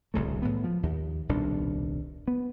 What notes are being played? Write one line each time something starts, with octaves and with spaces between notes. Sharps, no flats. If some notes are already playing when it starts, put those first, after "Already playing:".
D1 C2 C#3 A3
A2 E3 B3
F3
D#2
D#1 C2 B2 D4
B3